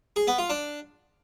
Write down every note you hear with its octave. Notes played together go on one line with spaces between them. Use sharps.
G#4
B3
F4
D4